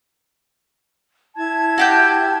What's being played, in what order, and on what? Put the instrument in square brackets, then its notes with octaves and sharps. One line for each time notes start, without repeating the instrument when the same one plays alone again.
[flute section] E4 A5 G#6
[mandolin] F#4 G4 G6